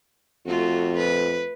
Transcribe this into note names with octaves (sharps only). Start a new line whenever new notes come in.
F2 A3 F4 F#4
B4